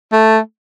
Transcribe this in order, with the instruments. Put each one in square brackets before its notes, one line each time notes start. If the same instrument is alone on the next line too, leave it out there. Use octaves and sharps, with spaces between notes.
[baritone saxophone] A3